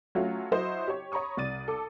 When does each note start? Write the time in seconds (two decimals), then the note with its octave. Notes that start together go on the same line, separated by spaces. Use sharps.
0.15 F#3 A3 C#4 F4 F#4
0.52 F#3 E4 F#4 C5 D#5
0.87 G4 C#5
1.12 C#5 A#5 B5 C#6 D#6
1.37 C2 D5 A6 D#7
1.68 A4 D6